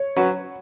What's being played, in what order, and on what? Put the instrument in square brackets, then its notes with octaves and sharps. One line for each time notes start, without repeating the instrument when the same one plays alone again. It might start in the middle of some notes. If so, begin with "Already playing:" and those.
Already playing: [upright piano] C#5
[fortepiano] F#3 C#4 F#4 B4